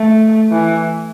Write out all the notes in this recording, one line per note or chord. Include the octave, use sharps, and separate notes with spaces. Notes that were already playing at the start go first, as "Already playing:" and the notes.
Already playing: A3
E3